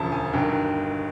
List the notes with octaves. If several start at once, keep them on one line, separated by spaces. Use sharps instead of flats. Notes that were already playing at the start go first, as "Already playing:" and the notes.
Already playing: E1 D2 C#3 F3 A5 A#5
G#5
G1 G2 D#3 F#3 G5